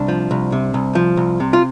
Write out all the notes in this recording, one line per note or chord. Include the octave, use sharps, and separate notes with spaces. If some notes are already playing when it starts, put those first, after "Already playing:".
Already playing: C2 D4
F3
C2
C3
C2
F3
C2
C3
F4